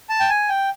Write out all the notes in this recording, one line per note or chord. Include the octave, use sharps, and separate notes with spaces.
A5
G5
G#5
G5